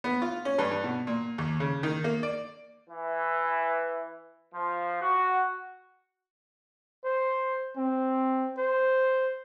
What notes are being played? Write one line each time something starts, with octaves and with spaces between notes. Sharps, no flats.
B3
F4
C#4
G2
G2
B2
A#2
D#2
C#3
D#3
A#3
D5
E3
F3
F#4
C5
C4
C5